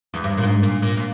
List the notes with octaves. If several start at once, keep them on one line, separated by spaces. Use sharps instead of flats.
E2
G2
A#2
G#2
A#2
A#2
A#2